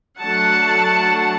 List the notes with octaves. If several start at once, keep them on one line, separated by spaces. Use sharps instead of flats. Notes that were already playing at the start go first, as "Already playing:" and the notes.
F#3 A3 D4 F#5 A5